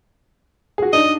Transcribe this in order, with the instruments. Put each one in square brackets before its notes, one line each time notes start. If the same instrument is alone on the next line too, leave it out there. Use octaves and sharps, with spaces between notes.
[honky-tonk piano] F#4 G#4
[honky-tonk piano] D4 D#4 [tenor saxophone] D#5